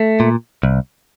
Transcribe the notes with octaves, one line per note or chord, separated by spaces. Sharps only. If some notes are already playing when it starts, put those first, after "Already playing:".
Already playing: A3
A#2
C2